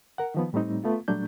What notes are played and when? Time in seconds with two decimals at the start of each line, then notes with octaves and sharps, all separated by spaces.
0.18 A#4 F#5
0.35 D#3 F3 B3
0.53 A2 G3 A3 C4 D#4
0.84 A3 B3 F4
1.08 A#2 F#3 G3 A3 D4 G6